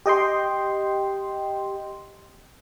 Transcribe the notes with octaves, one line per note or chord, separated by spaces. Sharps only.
G4 D#5 G5 C6